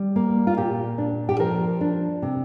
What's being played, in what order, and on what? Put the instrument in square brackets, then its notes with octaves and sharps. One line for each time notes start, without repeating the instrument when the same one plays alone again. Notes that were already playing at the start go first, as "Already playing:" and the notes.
Already playing: [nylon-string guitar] G3
A#3
F4
A#2 G4
D4
G4
F3 A#4
D4
C3